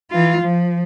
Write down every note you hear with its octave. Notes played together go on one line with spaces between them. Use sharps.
E3 F4
F3